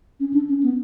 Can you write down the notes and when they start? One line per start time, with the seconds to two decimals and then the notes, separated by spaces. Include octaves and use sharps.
0.20 C#4
0.33 D4
0.49 C#4
0.63 B3